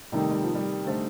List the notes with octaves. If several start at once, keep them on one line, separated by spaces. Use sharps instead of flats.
C3 D#3 G3 A3 D#4
G3
F3
G3
D3 A3 D#4 A4 C5